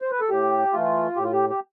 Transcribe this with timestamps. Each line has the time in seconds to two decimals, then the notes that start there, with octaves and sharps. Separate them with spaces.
0.02 C5
0.11 B4
0.20 A4
0.29 A2 G4
0.73 E3 A3 F4
1.16 A2 G4
1.24 F4
1.32 G4
1.49 G4